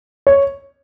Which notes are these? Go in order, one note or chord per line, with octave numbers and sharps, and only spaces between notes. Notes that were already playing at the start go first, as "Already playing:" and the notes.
C#5